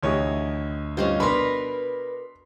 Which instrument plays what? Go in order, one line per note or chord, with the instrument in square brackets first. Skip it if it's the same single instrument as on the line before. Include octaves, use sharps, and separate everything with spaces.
[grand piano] D2 C#5 D#5 [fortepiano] D#3 E3 G4
[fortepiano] G2 G3 C5 [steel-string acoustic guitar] C#4 D#4 F4
[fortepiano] B2 D4 [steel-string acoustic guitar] A#4 B4 [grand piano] B5 C6